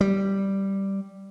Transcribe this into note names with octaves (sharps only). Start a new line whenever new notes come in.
G3